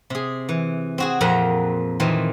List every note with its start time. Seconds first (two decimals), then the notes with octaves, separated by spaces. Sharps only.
0.10 C3 G#4
0.49 E3
0.98 C4 F#4 G#4
1.21 F2 A#2 C4 A#4 F#5 A#5
2.00 A#2 D#3 E3 C4